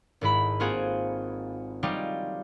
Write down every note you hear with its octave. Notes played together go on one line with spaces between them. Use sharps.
G#1 G#2 E4 B5
A#3 C4 F4 F#4 G#4
F#3 G3 D#4 F4 G4